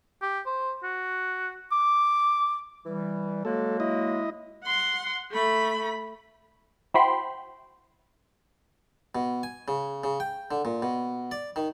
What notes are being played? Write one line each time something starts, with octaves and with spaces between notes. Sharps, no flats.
G4
C5
F#4
D6
E3 G3
F#3 G#3 A#3 A4
E4 D#5
F#5 C6
A3 B5
E4 F#4 C5 G5 B5 C6
B2
G#5
C#3
C#3
G5
D3
A#2
B2
D5
D#3